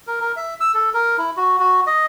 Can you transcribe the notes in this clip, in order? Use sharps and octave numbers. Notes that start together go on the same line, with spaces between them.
A#4
A#4
E5
E6
A4
A#4
E4
F#4
F#4
D#5